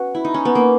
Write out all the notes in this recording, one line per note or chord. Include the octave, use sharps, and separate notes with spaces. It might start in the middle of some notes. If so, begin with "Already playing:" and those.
Already playing: B3 C#4 F#4
E4
D#4
C#4
B3
A#3